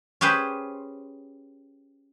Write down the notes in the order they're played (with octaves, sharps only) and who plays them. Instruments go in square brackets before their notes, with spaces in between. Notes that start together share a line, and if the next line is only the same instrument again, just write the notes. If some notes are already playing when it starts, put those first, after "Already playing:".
[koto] C#4 G4 G#4 B4 C5